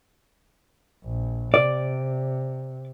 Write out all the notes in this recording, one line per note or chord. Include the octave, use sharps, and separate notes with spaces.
A#1
C3 D5